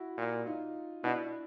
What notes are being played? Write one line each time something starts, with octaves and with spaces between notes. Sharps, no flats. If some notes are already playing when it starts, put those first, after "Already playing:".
Already playing: E4 F#4
A#2
D#4 F4
B2 D4 E4